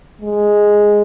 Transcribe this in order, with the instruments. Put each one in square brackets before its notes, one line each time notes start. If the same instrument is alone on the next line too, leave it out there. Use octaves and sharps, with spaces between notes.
[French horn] G#3